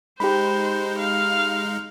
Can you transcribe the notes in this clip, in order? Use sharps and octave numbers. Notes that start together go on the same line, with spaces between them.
G#3 D#4 G4 C5 B5
F5